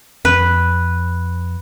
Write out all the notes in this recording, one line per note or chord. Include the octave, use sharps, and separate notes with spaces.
F2 B4